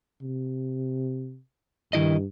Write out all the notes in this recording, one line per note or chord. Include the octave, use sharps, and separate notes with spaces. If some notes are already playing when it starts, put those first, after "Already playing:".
C3
G2 D#3 E4 D#5